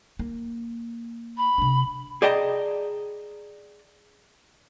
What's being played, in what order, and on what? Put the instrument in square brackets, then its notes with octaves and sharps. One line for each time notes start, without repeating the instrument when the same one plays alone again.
[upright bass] A#3
[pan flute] B5
[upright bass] C3 D4
[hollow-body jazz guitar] G#4 D5 D#5 G5 A5 A#5